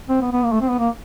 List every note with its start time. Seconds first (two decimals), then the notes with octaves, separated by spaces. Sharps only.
0.09 C4
0.21 B3
0.32 B3
0.44 A#3
0.52 A3
0.61 C4
0.70 B3
0.79 A#3